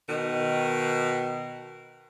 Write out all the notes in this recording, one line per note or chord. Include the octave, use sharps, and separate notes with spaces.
B2 D#3